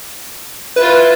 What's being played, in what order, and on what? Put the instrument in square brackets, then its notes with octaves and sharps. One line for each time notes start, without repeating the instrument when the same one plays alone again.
[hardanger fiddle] E4 F4 [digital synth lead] B4